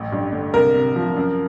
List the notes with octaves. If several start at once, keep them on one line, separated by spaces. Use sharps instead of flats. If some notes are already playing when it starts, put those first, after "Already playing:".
Already playing: A1
G2
D3
C2 A#4
C3
F3
F#2